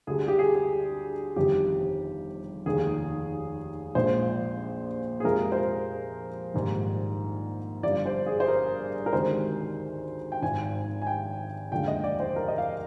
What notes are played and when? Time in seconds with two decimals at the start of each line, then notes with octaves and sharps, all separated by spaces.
0.07 D2 D3 G3 G#4
0.28 G4
0.39 G#4
0.55 G#4
1.36 G1 F2 C3 D#3 G3 G4
2.66 F1 D#2 D#3 G#4
3.95 A#1 A#2 G#3 C5
5.20 G#4
5.24 F2 C3 F3 G#3 A#4
5.52 C5
5.56 A#4
6.54 A#1 G#2 D#3 G3
7.83 G1 G2 F3 D5
8.06 C5
8.26 G#4
8.40 C5
8.48 A#4
9.06 A#4
9.13 D2 C3 D#3 G#3 C5
10.32 G5
10.42 G#1 G#2 F3 G#5
11.02 G#5
11.07 G5
11.72 F1 D#2 D3 F3 G#3 G5
11.88 D#5
12.04 D5
12.20 C5
12.36 A#4
12.48 D#5
12.58 F5